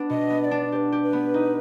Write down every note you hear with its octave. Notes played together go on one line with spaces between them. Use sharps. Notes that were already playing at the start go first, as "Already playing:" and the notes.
Already playing: B3 D4
B2 D#5
B3
D#5
D5
D4
G4 B4 D5
G4
B4
B3
D#4